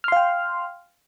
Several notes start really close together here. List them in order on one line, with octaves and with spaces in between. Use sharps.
F6 C6 F5 G5